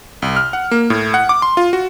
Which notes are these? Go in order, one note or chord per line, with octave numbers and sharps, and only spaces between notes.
C2
F6
F#5
A#3
A2
F#5
D6
C6
F4
F#4